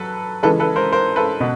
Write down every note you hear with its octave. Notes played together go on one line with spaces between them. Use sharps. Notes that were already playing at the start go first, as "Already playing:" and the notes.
Already playing: F#3 A4 B4
C#3 E3 G#3 A4 B4
A4 B4
A#4 C5
A#4 C5
A4 B4
B2